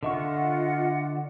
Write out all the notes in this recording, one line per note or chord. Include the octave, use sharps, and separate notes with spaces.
D3 F4 D#5 E5 F#5 C#6